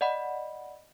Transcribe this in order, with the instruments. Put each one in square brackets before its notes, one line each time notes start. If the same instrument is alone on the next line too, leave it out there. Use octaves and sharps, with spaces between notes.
[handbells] D5 D#5 F#5 B5